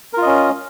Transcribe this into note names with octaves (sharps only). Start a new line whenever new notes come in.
C#4 F4 A#4 D#5